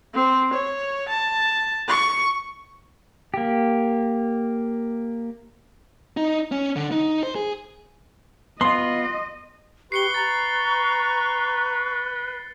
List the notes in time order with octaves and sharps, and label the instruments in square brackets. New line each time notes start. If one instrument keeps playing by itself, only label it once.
[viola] C4
C#5
A5
C#6
[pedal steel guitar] A#3 G4
[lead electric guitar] D#4
C#4
D3
D#4
C5
G#4
[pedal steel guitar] B3 F4 [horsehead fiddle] D#5 [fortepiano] C6
[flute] G4 [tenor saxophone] B4 [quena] C#6 [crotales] C7 C#7 G7
[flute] A#5 [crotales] A6